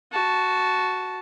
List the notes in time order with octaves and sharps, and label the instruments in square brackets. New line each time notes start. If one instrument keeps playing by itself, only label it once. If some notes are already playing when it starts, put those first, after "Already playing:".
[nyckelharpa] F#4 A5